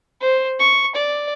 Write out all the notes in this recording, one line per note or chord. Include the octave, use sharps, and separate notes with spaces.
C5
C#6
D5